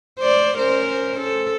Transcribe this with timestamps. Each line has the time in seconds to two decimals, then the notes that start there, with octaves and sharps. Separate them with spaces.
0.19 C5 D5
0.58 C#4 A#4 C5
1.21 A4